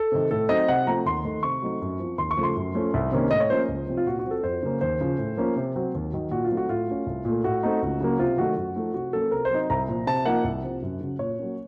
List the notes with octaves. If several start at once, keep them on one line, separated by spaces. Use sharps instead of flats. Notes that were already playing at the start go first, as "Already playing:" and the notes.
Already playing: A4
C3 D#3
A2 A4
F#3 C4 D#4 D#5
C3 F#5
F3 A3 C4 A#5
D#2 C6
D#3 A3
C3 C#6
F#3 A3 C4 D#4
F#2
F3 C4
D#2 C6
C#6
C#3 F3 A3
C6
F#2
F3 A3 C#4
C2
C3 D#3 A#3 C#4
A2 D#5
C#5
F3 A#3 C#4 C5
C#2
C3 F3 C4
F4
A#2 F#4
F#4
F3 C4
A4
F2 C5
C#3 F#3 A#3 C#4
D#2 C5
C#3 F3
A2
F3 A#3 C#4
C3
F#3 C4
D#2
D#3 F#3
A#2 F#4
F4
F#3 A3 C4 D#4
F#4
A2 F4
A3 C#4
C2
A#2 A3
A2 F#4
A3 C4 D#4
C#2
C#3 F#3 A#3
C3 F4
D#3 F#3 A3 F#4
F#2 F#4
F3 A3 D#4
C3 F#4
F#3 A#3 C#4 A4
C3 A#4
C5
F#3 C4 D#4
C2 A#5
A#2 F3
C3 A5
F3 A#3 D#4 F#5
C2
C3 F3
F#2
C#3 F#3
A#2 C#5
F#3 A#3 C#4